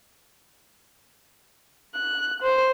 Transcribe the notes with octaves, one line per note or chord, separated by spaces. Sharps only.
F#6
C5